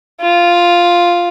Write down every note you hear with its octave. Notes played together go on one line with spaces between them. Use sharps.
F4